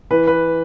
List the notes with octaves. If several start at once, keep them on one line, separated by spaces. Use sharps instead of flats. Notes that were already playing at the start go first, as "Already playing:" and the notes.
E3 B4
B4